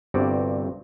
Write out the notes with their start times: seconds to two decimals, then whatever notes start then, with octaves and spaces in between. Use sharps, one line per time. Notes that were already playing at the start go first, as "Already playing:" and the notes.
0.14 G1 G2 C3 C4 F#4 D5